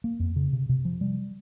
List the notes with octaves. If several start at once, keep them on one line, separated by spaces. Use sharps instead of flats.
A#3
F2
C#3
C3
C3
F3
G3